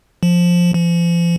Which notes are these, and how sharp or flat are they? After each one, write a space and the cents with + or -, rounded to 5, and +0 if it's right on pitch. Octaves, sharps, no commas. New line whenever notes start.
F3 +5
F3 -40